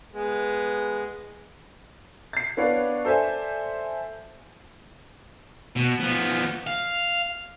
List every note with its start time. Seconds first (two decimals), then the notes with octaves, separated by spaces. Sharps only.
0.13 G#3 B3
2.33 A6 C7
2.57 B3 D4 B4 C#5 D5 F5
3.05 A4 C5 D5 E5 G#5
5.76 B2
6.00 F3 B3
6.67 F5